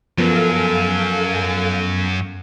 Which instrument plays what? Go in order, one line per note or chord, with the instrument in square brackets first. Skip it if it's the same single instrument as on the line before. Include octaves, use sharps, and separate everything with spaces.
[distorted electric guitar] F#2 F#3 [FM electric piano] F3 B3 A#4 [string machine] A4 F5 G#5